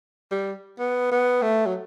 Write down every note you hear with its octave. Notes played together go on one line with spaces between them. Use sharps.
G3
B3
B3
A3
F#3